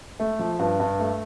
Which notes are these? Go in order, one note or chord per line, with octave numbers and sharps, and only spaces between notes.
A3
F3
G2
G2
A3